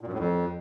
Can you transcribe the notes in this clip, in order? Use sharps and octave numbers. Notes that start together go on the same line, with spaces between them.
A#2
F#2
A2
F2